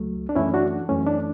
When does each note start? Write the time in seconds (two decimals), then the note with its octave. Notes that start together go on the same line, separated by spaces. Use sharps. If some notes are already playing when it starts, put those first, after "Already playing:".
Already playing: C#2 F#3 A3
0.29 D4
0.35 F#2 E3 A3 C#4 E4
0.54 D4 F#4
0.89 F#2 E3 A3 C#4
1.07 D4